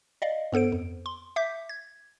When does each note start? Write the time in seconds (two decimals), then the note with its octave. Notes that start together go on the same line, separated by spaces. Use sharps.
0.22 D5 D#5 F5
0.52 G2 B3 A4 C5 D7
0.72 F2
1.06 C6
1.36 E5 D6 G6 B6
1.69 G#6